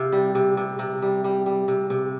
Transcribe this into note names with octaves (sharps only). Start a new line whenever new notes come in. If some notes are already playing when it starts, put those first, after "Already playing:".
Already playing: C3 F5
G3
C3
C3
C3
G3
G3
G3
C3
C3